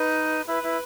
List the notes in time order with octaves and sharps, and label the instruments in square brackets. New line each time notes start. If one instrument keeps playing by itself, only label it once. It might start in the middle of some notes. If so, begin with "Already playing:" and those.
Already playing: [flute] D#4 [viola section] B4
[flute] E4 [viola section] B4
[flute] E4